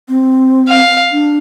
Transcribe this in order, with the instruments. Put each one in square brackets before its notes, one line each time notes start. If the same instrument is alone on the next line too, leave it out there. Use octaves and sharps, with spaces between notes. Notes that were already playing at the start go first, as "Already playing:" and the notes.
[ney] C4
[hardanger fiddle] F5
[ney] D4